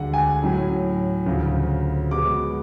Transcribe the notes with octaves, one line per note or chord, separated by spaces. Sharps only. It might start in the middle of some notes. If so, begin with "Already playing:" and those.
Already playing: D2 D3 G#3 D4 F#5
G#5
A2 F#3 C#4
D2 C#3 F3
B2 G#3 B3 D6